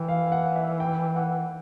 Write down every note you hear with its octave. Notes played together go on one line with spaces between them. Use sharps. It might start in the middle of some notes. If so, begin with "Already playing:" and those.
Already playing: E3 G5
F5
F5
F#5
E5
G5
F#5